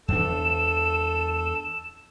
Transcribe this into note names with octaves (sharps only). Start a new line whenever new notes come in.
E2 D4 A4 E7